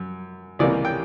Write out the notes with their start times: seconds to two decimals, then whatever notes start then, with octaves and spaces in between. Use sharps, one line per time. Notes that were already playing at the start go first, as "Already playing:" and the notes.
Already playing: F#2
0.59 C#2 C3 E3 G3 A#3 D5
0.85 G5